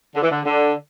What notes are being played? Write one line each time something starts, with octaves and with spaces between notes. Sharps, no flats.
D3
E3
D3
D3